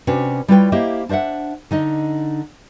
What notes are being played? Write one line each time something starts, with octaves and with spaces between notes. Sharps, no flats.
C3 C#4 D4 F#4 B4
G3 E4 F4 B4 C#5 G5
A#3 E4 G4 C5 D#5
D4 C5 D#5 E5 F#5
D3 D#4 D#5